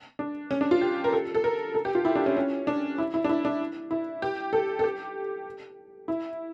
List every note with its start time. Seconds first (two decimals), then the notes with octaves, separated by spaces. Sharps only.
0.19 D4
0.51 C#4
0.61 D4
0.71 F4
0.81 G4
1.04 A#4
1.12 A4
1.35 A4
1.44 A#4
1.74 A4
1.85 G4
1.95 F4
2.05 E4
2.15 D4
2.26 C#4
2.37 C#4
2.67 D4
2.98 E4
3.14 E4
3.24 D4
3.29 E4
3.45 D4
3.91 E4
4.22 G4
4.53 A4
4.79 A4
4.84 G4
6.08 E4